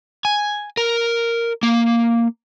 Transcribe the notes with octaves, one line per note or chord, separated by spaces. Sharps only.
G#5
A#4
A#3